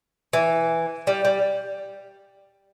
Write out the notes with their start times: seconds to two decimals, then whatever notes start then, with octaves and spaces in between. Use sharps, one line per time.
0.33 E3
1.07 G3
1.25 G3